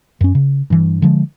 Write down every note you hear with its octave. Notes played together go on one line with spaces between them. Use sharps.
F#2 C#4
C#3
G2 E3
D3 F3 G#3